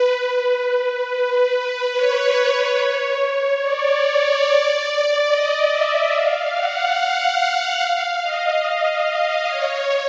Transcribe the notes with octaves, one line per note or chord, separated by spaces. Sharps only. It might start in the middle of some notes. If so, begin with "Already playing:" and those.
Already playing: B4
B4
C#5
D5
D#5
E5
F5
F#5
F5
D#5
C#5